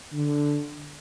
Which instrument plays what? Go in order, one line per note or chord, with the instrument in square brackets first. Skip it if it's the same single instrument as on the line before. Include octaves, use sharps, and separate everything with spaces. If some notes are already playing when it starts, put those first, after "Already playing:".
[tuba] D3